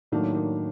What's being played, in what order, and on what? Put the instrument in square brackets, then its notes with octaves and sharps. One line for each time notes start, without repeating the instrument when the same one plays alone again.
[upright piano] A2 F#3 A#3 D4 [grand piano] D#3
[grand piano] D#3